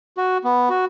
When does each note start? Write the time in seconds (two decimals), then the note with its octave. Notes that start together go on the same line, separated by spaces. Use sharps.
0.17 F#4
0.44 B3
0.70 F#4